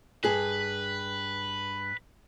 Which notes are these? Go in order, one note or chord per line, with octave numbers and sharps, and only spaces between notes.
G2 G#4 B4